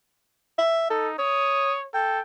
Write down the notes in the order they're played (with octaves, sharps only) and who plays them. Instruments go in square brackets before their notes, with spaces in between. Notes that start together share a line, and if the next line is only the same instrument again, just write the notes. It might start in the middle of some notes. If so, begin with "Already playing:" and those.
[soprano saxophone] E5
[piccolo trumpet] D#4 [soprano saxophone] A4
[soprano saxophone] C#5 [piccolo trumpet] D#6
[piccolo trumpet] A4 [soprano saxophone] G5